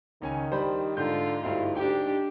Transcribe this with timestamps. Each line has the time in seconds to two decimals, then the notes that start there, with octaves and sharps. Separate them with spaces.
0.22 C#2 D#3 C#4 G#5
0.52 G3 D4 G4 C5 B5
0.97 G#2 D3 F4 G6
1.44 D2 G2 E4 F5
1.76 D4 G4 G5